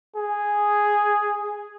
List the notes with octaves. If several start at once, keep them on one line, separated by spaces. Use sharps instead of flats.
G#4